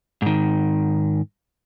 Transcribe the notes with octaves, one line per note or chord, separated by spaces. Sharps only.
G#2 D#3